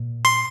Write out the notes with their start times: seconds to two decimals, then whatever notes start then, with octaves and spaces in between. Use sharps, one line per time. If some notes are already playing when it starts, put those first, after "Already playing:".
Already playing: A#2
0.25 C6